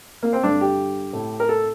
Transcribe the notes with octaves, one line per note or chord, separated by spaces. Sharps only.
A#3
C4
G2 D3 D4
G4
A2
A#4
A4